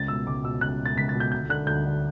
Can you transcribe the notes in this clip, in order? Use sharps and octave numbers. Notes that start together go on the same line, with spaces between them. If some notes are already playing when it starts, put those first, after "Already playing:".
Already playing: C#2 A6
B2 E6
C#2 D6
B2 E6
C#2 F#6
B2
A6
C#2 B6
A6
B2
G6
D2 G6
D3 F#6
D2 G6
D3